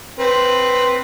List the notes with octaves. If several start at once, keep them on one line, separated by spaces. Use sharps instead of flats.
C4 B4